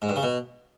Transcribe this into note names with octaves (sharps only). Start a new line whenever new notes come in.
G#2
G2
C#3
B2